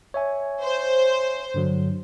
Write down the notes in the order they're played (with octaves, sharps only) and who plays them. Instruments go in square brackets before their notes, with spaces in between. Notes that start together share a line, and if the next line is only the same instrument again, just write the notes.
[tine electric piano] C#5 E5 G#5
[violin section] C5
[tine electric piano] G2 D3 F#3